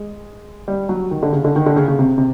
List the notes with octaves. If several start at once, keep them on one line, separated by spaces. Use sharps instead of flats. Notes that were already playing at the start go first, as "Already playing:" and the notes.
Already playing: G#3
G3
F#3
D#3
D3
C#3
D3
D#3
D3
C#3
C#3
C3
C3